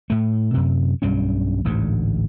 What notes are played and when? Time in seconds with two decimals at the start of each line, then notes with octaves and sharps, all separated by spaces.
0.10 A2 A3
0.54 F#2 C3
1.02 B1 G2 G3 C#4
1.65 A1 D2 G#2 D3